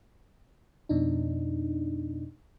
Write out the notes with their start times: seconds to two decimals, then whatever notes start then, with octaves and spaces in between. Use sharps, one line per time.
0.89 F2 B2 D4 D#4